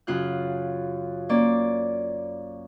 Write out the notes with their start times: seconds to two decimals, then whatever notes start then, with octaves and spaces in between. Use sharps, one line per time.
0.07 F#2 C#3 F4 F#6
1.29 A#3 C#4 D5